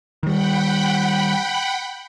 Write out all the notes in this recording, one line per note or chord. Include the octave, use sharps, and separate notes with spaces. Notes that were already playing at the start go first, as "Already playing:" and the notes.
D#3 G3 F#5 G5 B5